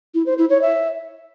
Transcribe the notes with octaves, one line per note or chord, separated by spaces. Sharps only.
E4
C5
E4
C#5
E5